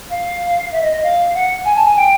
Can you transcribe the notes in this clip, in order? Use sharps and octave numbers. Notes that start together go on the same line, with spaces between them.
F5
E5
D#5
D#5
F5
F#5
G#5
A5
G#5
G5